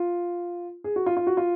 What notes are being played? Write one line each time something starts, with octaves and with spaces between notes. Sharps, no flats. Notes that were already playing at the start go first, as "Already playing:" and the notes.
Already playing: F4
G#4
F#4
F4
F4
F#4
F4